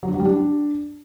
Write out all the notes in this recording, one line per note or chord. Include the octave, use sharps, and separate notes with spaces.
F#3
D4
F#3
G3
D4